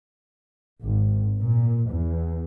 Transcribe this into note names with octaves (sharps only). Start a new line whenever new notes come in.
G#1
A#2
E2